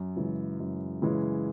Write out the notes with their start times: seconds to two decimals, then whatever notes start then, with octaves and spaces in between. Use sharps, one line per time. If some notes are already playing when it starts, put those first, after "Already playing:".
Already playing: F#2
0.16 C#3 E3 G#3
0.60 F#2
1.02 C#3 E3 G#3